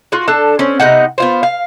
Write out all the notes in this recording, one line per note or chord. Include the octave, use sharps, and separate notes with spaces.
F4 F#4
D4 A4 A5
C4 C#4
C3 B3 D#4 F#5
B3 F4 C5
F5